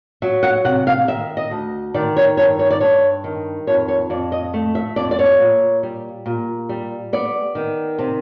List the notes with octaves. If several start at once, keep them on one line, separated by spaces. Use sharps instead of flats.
F#3 E5
F#5
C3 F#5
F5
D#3 E5
D#5
D2
D#3 D5
C#5
G2 C#5
C#5
D5
G2 C#5
D#3
F2 C#5
C#5
F2 D5
D#5
A3
E5
F2 D5
D5
C#5
A#2
G3
A#2
G3
B3 D5
D#3
C3